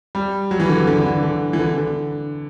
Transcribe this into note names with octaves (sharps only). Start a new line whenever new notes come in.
G3
F#3
E3
D3
D3
E3
D3
D3
E3
D3
D3